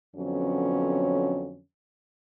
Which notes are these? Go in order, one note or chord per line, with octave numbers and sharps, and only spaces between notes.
F2 D3 F#3 B3 C#4